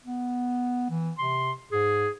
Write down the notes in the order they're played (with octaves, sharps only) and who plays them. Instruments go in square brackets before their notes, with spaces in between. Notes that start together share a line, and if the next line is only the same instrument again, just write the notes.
[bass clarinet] B3
E3
[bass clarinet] C3 [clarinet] C6
[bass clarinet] G#2 [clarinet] G#4